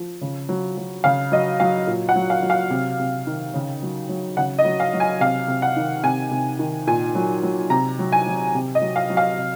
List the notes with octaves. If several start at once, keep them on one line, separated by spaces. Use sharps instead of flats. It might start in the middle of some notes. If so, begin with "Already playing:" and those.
Already playing: F3
C#3
F#3
F#3
C#3 F5
F#3 D#5
F#3 F5
A#2
F#5
F#3
F5
F#3
F5
C3
C3
D#3
C#3
F#3
F#3
C#3 F#5
D#5
F#3
F5
F#3
G#5
C3 F5
C3
F#5
D#3
C3 G#5
C3
D#3
A#2 G#5
F#3
F#3
C3 A#5
F#3
G#5
F#3
C3
D#5
F#3
F5
F#3
F5
C3